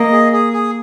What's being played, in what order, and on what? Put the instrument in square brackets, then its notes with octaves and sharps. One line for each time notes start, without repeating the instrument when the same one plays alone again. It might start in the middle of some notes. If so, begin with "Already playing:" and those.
Already playing: [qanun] A#3 [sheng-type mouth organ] D#5
[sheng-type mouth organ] G#4
G#4
G#4